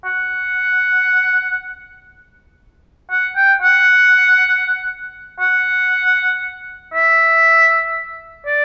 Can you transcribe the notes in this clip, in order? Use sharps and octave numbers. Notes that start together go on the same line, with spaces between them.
F#5
F#5
G5
F#5
F#5
E5
D5